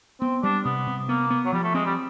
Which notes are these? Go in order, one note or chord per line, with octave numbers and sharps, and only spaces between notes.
B3 C4
G3 D4
C3 B3
C3
A#3 B3
B3
F#3
F3 G3
A3
G#3 C4
G3